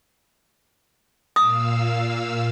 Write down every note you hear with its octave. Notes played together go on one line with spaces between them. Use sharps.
A#2 F5 D#6 E6